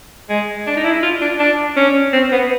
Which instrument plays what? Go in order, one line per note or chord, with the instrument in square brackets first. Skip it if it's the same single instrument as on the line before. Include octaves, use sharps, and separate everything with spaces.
[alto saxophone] G#3
D4
D#4
E4
F4
D4
D4
C#4
C4
B3